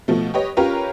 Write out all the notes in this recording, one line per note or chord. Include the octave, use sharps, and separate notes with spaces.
B2 F3 A3
G4 B4 C#5 D#5
C#4 F4 G4 A#4 B4 C#5